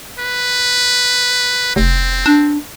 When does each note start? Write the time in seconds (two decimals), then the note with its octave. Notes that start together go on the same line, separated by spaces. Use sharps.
0.19 B4
1.76 F1 C4
2.26 D4